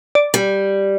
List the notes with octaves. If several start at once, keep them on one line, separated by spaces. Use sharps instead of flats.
D5
G3